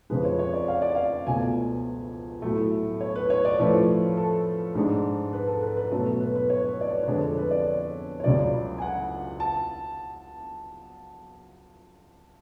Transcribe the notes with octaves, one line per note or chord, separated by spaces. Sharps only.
F2 C#3 F3 G#3 B4
C#5
C#5
D5
F5
D5
F5
C#2 B2 A3 G#5
A2 F#3 A3
C#5
B4
C#5
D5
A2 F3 A3 C#4 B4
A4
G#2 G#3 D4
B4
A4
B4
B4
B2 F#3 A3 C#4 A4
B4
B4
B4
C#5
B4
D5
C#5
B4
F2 D3 G#3 D4 C#5
A4
B4
B4
D5
C#5
C#5
C#2 C#3 F#3 D5
G#5
F#5
A5